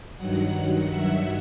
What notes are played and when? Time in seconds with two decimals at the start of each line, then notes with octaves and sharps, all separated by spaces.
0.16 G2 D#3 F#3 F#5
0.88 E5